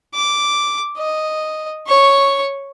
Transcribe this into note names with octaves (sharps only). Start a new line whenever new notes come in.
D6
D#5
C#5 C#6